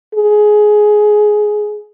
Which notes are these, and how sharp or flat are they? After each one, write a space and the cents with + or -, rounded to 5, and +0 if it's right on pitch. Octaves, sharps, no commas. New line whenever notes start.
G#4 +15